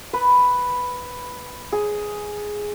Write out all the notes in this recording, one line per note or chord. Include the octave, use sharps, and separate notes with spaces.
B4
G#4